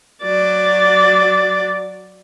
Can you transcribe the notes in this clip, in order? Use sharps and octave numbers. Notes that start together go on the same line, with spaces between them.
F#3 D5